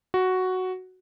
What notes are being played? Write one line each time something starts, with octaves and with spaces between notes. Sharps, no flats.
F#4